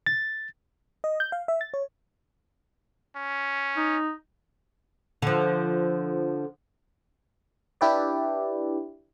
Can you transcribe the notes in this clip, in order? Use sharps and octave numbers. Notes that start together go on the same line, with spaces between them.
A6
D#5
G6
F5
E5
A6
C#5
C#4
D#4
D3 F3
D4 E4 G4 B4 D5